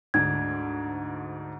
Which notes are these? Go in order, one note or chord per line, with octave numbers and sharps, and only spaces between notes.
D2 G#2 D4 G#6